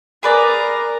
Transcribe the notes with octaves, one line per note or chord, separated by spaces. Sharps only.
G#4 A#4 B4 D5 A#5